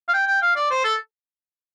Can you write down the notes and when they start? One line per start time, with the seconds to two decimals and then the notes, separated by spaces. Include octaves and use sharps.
0.08 F5
0.13 G5
0.27 G5
0.42 F5
0.56 D5
0.71 C5
0.84 A4